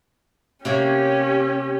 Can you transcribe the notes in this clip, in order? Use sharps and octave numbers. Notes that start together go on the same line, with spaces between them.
C3 A#3 C#4 G4 C#5